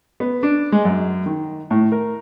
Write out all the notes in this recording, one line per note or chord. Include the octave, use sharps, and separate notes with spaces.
B3
D4
G#3
F#2
D#3
A2
A#4